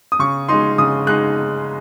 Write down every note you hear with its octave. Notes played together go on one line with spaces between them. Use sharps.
D#6
C#3 C#6
G#3 D#4 C6
C#3 D#6
G#3 D#4 F#6